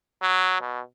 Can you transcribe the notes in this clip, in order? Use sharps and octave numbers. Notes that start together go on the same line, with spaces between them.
F#3
B2